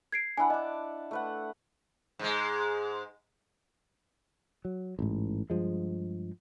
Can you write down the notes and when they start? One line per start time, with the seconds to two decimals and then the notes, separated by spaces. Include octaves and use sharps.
0.12 G#6 C7 D7
0.37 D4 E4 F#5 G#5 B5
0.50 D#5 A5 D6
1.11 A3 B4 F#5
2.19 G#2 G#3
4.65 F#3
4.99 A1 G#2
5.50 G2 F3 G#3